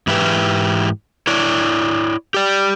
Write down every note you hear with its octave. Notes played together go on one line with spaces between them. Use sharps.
G#2 E3 E4 G4 B4
E4 C#5 D5
G4 D5